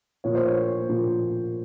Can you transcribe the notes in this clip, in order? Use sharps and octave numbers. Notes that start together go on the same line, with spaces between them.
A#2 F3 A#3 C#5
C5
C#5
A#2 F3 A#3